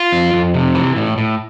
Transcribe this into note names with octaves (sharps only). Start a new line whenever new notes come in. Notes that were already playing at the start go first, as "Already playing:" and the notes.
Already playing: F4
F2
F2
C3
E3
A2
A2